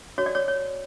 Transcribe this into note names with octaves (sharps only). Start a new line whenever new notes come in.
F#4 C#5
D5
C#5
C#5